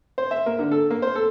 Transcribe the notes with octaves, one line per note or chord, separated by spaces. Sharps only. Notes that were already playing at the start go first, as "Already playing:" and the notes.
C5
E5
A#3
D3
A4
A#3
C5
A4